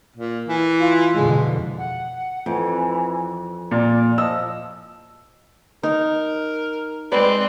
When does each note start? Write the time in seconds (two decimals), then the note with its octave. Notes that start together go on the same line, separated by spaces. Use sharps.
0.16 A#2
0.48 E3
0.80 F4
1.15 F2 B2 D3 G#3
1.78 F#5
2.46 F2 E3
3.71 A#2 D5
4.18 F3 D#5 E6
5.83 D#4 A#4
7.12 G#3 C4 B4 D5